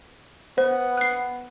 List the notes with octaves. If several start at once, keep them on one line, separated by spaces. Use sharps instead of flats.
B3 C5
F#6 C7